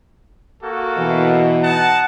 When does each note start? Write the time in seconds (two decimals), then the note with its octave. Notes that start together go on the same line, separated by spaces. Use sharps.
0.61 A#3 F#4 A4
0.98 B2 E3
1.62 D#4 F#5 A5